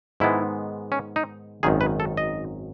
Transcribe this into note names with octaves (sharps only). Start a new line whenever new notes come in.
G#2 D#3 G#3 B3 E4
C#4
D#4
G#1 F#2 D#3 G#4
B4
A4
D#5